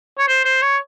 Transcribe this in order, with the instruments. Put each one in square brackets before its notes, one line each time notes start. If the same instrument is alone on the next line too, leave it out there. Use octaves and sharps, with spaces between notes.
[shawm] C#5
C5
C5
C#5